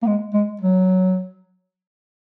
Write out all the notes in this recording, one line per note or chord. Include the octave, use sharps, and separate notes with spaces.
A#3
G#3
G#3
F#3